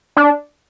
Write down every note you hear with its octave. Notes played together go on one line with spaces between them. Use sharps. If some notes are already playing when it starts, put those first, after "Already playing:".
D4